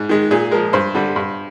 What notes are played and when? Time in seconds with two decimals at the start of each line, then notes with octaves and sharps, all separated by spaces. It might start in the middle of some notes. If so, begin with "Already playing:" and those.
Already playing: G#2
0.09 D#3 G#3
0.31 A#2 G#4
0.51 F3 G#3 A#4
0.73 G2 C5
0.95 D3 G3
1.16 G2